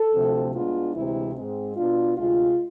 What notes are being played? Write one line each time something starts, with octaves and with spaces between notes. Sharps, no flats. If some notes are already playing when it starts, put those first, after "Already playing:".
Already playing: A4
D2 C3 F3 A3 C4
A2 G#3 B3 D4 F4
D2 C3 E3 G#3 C4 E4
G#2 G#3 C4
B2 B3 D4 F4
D2 C3 G#3 F4